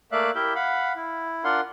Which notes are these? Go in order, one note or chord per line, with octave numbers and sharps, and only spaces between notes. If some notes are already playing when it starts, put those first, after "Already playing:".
A3 A#3 D5 E5 F5 F#6
E4 G4 A#4 E5 G6
F5 F#5 B5
E4
D4 F4 A#4 F#5 C6